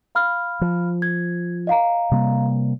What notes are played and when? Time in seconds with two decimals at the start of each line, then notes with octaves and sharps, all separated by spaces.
0.15 F5 B5 F6
0.61 F3
1.02 G#6
1.67 D#5 F5 A#5
2.11 C3 G3 A#3